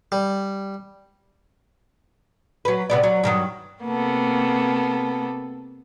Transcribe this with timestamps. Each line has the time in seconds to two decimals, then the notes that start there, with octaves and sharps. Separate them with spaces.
0.12 G3
2.65 F#3 B4
2.90 C3 B3 D5
3.03 F#3
3.23 G2 D#3 F#3
3.85 C3 A#3 B3 A4